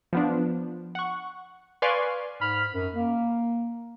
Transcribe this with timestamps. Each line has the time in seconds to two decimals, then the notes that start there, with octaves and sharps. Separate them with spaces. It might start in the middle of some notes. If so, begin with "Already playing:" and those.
0.13 F3 B3 D4
0.95 F#5 C#6
1.82 B4 D5 F5 G#5 C6 C#6
2.40 G#2 B5 F6
2.73 F#2
2.94 A#3